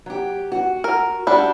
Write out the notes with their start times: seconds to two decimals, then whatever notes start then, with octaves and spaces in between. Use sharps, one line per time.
0.06 F#3 G4
0.52 F#4
0.84 A#4
1.27 G3 D4 F#4